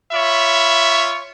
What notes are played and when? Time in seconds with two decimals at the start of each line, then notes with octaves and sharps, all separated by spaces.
0.12 F4 C#5 E5 B5